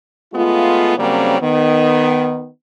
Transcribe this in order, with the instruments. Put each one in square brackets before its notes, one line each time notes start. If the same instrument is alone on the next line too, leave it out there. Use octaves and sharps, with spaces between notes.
[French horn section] G#3 A3 B3 F4
C#3 F#3 G3 A#3 C4 C#4
D#3 B3